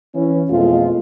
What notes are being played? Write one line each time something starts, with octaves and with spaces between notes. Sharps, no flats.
E3 C#4
F2 B2 G#3 A3 B3 F4